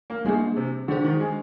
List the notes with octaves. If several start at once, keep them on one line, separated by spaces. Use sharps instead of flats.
A#3
G3 G#3 A#3 D4 G#4
C3
D3 G#3 D4 G#4 C5
D#3
G#3